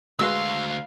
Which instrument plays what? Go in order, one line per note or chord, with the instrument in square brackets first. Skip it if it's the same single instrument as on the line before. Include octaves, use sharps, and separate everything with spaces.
[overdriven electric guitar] D2 C6 [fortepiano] G#3 F#4 B4 [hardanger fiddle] F5 [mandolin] E6